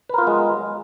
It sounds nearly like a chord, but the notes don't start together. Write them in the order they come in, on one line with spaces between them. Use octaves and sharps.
B4 A#4 F4 B3 G#3